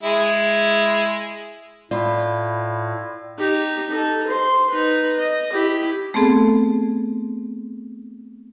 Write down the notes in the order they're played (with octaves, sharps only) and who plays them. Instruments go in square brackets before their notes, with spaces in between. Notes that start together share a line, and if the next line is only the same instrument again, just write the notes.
[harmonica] G#3 E4
[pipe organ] A2 [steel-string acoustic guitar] F4 [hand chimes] D5 B5
[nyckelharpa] D#4 G4
D#4 A4
C5 C6
D#4 B4
D#5
E4 G4
[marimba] A3 B3 C4 G#4 A4